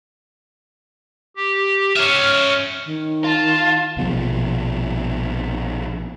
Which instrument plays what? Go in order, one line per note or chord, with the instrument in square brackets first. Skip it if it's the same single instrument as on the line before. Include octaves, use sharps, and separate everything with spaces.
[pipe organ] G4
[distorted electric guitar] C#4 E5 [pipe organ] F6
[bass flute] D#3
[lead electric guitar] F4 [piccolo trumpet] A5
[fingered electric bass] A#1 B2 E3 F3